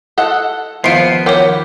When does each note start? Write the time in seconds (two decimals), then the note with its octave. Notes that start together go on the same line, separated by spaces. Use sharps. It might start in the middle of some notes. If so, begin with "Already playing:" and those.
0.18 A4 D#5 F#5
0.84 D#2 F3 B3 F4 C5 C7 D7
1.26 F#3 G4 A#4 C#5 G5